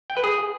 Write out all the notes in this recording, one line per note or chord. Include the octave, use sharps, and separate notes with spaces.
G5
B4
G#4